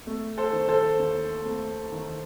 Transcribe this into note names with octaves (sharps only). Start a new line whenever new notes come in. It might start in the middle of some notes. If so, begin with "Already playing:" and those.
A3
A4 C5
D#3
A4 C5
D#2
A3
D#3